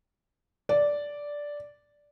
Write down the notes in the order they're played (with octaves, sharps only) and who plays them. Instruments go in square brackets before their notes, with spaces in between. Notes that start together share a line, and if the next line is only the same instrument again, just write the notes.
[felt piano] D5